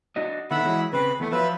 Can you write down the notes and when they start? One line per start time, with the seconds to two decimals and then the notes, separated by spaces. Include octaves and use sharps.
0.16 D4 F#4 D#5
0.51 D3 D#3 B3 E5 F#5 B5
0.65 E3 F#3 G#3
0.93 C#3 C4 B4
1.20 E2 A3 B3
1.32 F3 F#3 F4 B4 E5